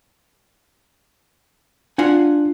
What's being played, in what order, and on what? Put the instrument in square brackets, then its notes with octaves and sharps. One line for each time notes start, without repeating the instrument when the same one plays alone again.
[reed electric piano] D4 [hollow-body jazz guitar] F4 F#5 G#5